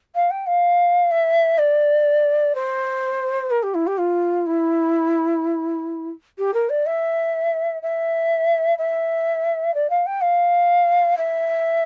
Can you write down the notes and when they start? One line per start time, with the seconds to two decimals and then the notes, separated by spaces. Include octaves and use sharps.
0.15 F5
0.30 G5
0.46 F5
1.11 E5
1.58 D5
2.55 C5
3.50 A#4
3.63 G4
3.74 E4
3.87 G4
3.98 F4
4.46 E4
6.38 G4
6.54 A#4
6.69 D5
6.86 E5
7.82 E5
8.78 E5
9.74 D5
9.90 F5
10.06 G5
10.21 F5
11.17 E5